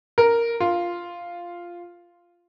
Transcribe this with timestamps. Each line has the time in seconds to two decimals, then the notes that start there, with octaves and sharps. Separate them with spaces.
0.18 A#4
0.60 F4